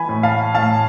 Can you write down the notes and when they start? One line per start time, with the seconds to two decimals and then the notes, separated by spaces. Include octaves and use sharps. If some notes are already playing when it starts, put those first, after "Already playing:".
Already playing: E3 G#5 B5
0.09 A2
0.23 F5 A5
0.55 A2 F5 A5